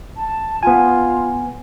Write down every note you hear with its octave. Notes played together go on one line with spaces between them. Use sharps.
A5
B3 F4 G#5